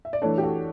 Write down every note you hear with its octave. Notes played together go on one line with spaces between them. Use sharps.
E5
D5
E3 A3 D4 A4 C#5
G4
F#4 A4